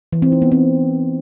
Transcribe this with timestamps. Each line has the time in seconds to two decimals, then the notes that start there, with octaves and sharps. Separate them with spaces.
0.13 E3
0.22 C4
0.32 D#4
0.42 B3
0.52 C4